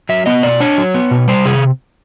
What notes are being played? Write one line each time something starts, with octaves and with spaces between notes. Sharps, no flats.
F#3 E5
B3 D#5
B2 D5
D4 C#5
F#3
B3
B2
G3 C5
C3 G#4